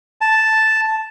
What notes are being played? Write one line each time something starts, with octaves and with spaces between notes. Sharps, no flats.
A5